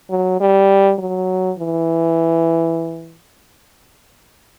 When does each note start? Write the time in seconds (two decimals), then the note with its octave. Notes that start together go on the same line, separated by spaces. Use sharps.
0.10 F#3
0.40 G3
0.99 F#3
1.58 E3